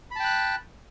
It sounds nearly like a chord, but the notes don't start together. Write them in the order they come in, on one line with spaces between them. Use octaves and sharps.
B5 A5 G5 F#6